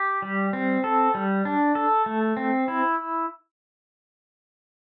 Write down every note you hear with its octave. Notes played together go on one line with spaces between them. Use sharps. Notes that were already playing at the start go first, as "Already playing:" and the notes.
Already playing: G4
G3
C4
A4
G3
D4
A4
A3
C4
E4